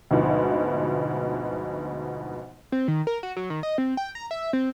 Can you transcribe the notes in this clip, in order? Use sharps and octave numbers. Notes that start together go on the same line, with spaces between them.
D2 G#2 B2 F3
C4
D#3
A#4
F#4
F#3
D#3
D#5
C4
G5
A#5
E5
C4